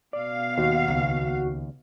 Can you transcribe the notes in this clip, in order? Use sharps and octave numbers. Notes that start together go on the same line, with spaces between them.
B2 D5 F5
D#2 F#4
C#2